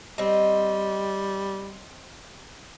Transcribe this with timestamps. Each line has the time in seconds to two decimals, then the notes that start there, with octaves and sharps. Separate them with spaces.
0.18 G3 C4 D#5